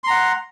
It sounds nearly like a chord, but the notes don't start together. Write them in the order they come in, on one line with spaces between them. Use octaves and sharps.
C6 A#5 F#5